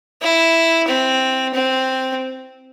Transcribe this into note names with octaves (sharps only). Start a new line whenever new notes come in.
E4
C4
C4